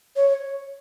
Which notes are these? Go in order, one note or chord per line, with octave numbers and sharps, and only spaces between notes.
C#5